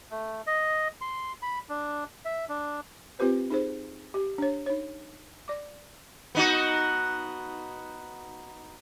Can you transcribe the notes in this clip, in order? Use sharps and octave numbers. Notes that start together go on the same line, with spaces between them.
A3
D#5
C6
B5
D4
E5
D4
C4 F4 G4 B4 C5
D#4 G#4 C5
G4
D4 C#5
D#4 C#5
D5 D6
B3 D#4 F#4